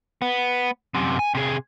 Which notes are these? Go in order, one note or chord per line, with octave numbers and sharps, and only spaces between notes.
B3
F#2 C3
G#5
C3 G#4